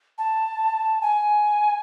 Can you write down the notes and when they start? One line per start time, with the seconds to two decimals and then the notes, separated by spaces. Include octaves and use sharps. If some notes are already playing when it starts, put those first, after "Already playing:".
0.18 A5
1.01 G#5